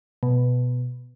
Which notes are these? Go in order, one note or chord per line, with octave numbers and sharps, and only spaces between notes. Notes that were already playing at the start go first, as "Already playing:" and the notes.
B2